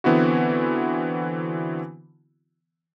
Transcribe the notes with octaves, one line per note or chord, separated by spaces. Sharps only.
D3 E3 B3 C4 E4 F#4